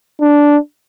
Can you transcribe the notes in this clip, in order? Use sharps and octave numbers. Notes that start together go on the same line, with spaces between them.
D4